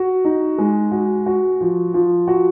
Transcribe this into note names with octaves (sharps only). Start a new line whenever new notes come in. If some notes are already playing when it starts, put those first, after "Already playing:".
Already playing: F#4
D#4
G#3
F#4
F#4
F3
F3
F#4